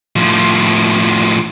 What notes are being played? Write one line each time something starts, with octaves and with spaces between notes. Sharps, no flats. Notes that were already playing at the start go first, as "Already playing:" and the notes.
A2 F3